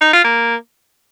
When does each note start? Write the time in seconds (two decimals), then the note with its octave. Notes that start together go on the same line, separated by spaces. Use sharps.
0.02 D#4
0.13 F4
0.25 A#3